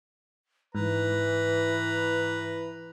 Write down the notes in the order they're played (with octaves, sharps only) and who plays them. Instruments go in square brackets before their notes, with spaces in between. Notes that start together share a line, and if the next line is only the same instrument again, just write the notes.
[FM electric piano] G#2 [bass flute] E3 [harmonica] B4 A#5